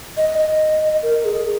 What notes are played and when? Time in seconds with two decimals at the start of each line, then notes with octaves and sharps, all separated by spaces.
0.17 D#5
0.38 D#5
1.03 A#4
1.25 G#4